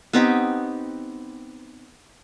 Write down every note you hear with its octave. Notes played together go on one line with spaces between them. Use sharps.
B3 C4 D#4 G4